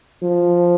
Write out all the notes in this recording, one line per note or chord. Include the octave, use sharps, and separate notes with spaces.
F3